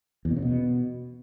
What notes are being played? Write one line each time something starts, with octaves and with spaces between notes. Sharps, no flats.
E2
B2
C#3
B2